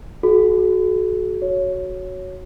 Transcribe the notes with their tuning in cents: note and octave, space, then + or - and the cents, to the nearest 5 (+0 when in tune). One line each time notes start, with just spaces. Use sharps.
F#4 +0 A4 -45
F#4 +0 C#5 +0